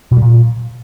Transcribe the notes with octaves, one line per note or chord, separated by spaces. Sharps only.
B2
G3
A#2